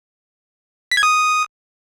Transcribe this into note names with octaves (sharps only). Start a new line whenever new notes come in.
B6
G#6
D#6